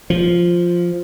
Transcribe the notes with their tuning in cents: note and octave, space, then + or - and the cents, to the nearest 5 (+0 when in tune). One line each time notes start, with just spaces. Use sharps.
F3 +0